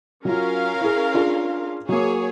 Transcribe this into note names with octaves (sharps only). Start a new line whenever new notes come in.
F#3 C#4 F4 A#4 F5
E4 G#4
D4 F4 G#4
F#3 A#3 G#4 C#5